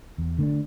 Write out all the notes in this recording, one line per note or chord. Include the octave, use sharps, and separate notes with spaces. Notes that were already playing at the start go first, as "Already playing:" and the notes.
E2
D3 A3 D4